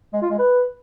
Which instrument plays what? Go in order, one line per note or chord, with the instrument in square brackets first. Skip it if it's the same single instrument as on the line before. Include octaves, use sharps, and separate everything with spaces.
[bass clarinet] G#3
F4
G#3
B4